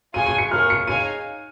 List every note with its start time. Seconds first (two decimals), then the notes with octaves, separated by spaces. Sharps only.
0.14 F4 G#4 C#5 G#5 D#7
0.26 D#7
0.38 C#7
0.50 A#3 C#4 F4 G#4 C#5 F6
0.70 C#7
0.87 D#4 G#4 C#5 F5 G#5 D#7